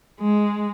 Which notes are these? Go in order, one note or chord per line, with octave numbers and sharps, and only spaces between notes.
G#3